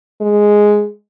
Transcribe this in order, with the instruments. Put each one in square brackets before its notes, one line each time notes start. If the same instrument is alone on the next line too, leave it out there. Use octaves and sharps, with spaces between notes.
[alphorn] G#3